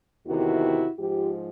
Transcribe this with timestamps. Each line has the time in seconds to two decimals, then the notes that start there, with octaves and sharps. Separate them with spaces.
0.27 E2 C3 D#3 E4 F#4
0.99 G#2 F3 F4 G4